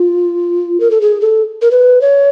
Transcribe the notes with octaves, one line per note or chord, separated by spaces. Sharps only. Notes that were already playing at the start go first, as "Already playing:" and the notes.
Already playing: F4
A#4
A4
G#4
A4
A#4
B4
C#5